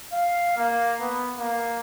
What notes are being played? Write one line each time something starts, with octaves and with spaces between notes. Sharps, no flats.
F5
A#3
B3
A#3